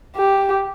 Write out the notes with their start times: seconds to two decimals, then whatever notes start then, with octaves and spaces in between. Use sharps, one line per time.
0.15 G4